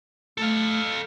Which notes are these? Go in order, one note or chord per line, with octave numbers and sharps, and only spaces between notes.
A3 A4 F5